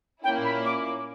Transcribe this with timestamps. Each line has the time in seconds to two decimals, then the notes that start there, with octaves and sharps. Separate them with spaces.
0.24 A#2 A#3 C#4 E4 G5
0.45 B5
0.65 D6
0.85 D6